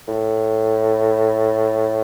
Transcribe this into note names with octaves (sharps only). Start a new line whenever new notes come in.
A2